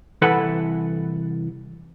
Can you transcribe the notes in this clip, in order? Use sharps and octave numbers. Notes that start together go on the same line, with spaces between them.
C2 E3 E4 A4 B4 F#5